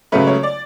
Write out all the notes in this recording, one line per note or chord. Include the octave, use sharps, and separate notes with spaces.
C#2 C#3 F#3 A3 B4
C#5
D5